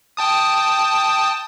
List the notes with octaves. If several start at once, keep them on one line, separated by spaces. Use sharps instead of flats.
G5 A5 D#6